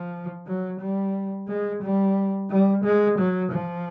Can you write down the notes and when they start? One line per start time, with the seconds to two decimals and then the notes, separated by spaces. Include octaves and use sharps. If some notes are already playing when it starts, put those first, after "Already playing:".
Already playing: F3
0.46 F#3
0.80 G3
1.48 G#3
1.82 G3
2.50 G3
2.84 G#3
3.18 F#3
3.52 F3